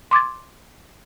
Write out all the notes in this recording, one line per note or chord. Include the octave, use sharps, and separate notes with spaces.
C6 D6 G#6 A6